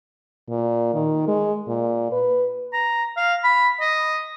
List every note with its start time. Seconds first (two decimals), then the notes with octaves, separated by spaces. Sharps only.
0.49 A#2
0.94 D#3
1.27 G#3
1.67 A#2
2.12 B4
2.73 A#5
3.17 F5
3.44 B5
3.81 D#5